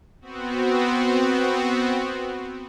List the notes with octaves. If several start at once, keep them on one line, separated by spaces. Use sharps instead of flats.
B3 C4 F#4